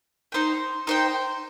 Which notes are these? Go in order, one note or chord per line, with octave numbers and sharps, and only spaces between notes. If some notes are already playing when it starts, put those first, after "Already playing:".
D#4 C5 G5
D#4 C5 G5